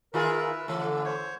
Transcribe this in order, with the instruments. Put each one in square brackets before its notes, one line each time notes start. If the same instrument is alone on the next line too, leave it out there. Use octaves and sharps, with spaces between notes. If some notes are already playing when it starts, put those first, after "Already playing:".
[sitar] D#3 F4 G#4 [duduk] A#4 [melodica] B4 E5
[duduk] D3 [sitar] E3 A3 [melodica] A4
[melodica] C5 C#5